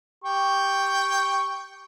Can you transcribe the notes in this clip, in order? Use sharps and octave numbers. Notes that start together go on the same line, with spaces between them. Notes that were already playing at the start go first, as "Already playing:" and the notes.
G4 G5 C#6